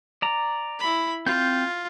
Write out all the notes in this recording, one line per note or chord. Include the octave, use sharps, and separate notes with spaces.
D5 A#5
E4 B5
C4 F4 G6